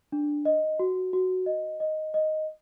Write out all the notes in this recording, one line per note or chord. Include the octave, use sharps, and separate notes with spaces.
D4
D#5
F#4
F#4
D#5
D#5
D#5